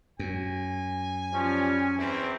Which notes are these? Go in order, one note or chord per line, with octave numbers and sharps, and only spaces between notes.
F#2 G#5
F3 G3 C#4
E2 C4 E4